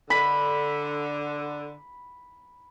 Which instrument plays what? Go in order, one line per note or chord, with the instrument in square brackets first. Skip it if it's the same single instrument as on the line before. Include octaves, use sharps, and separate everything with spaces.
[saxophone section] D3 [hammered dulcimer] B5